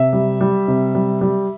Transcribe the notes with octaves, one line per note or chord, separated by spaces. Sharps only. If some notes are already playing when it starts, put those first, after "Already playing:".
Already playing: C3 E5
G3
G3
C3
G3
G3